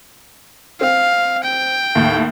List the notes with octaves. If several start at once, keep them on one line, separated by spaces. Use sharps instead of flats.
C4 F5
G5
D#2 A2